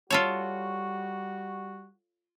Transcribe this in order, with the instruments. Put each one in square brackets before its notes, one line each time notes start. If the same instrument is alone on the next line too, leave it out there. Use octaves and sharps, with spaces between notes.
[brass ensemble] G3 F#4 [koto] F4 A4 C#5